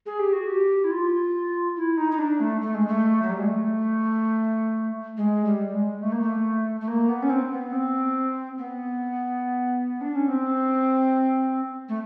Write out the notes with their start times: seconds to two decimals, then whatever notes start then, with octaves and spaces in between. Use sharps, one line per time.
0.06 G#4
0.19 G4
0.33 F#4
0.47 G4
0.84 E4
0.91 F4
1.76 E4
1.98 D#4
2.11 D#4
2.19 D4
2.40 A3
2.62 A3
2.75 G#3
2.88 A3
3.22 F#3
3.30 G3
3.39 G#3
3.46 A3
5.17 G#3
5.45 G3
5.74 G#3
6.02 A3
6.12 A#3
6.22 A3
6.81 A3
6.88 A#3
7.09 B3
7.23 C#4
7.30 C4
7.52 B3
7.73 C4
8.58 B3
10.01 D4
10.15 C#4
10.29 C4
11.89 A3